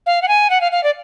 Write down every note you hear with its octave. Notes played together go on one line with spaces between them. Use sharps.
F5
F#5
G#5
F#5
F5
F5
D5